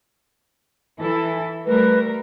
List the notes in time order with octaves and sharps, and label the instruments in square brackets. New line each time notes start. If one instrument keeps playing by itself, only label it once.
[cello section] E3 E4 A4
[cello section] G3 A3 A#4 [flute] B4